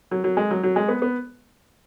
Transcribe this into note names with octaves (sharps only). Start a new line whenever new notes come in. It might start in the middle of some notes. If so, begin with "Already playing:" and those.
F#3
F#3
G#3
F#3
F#3
G#3
B3
B3